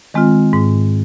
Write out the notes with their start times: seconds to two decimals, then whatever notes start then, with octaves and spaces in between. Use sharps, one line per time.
0.14 D#3 G#3 C4 F4
0.53 G#2